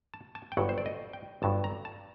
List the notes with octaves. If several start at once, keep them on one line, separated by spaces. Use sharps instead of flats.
A5
A5
G5
G1 G2 F#3 F#5
C5
D5
D#5
G5
G1 G2 F#3 A5
A#5
A5